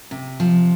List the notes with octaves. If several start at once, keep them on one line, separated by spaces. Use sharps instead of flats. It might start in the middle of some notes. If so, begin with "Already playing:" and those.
C3
F3